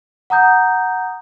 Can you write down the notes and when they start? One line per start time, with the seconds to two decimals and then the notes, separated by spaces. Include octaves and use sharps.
0.30 F#5 A#5 D#6 G6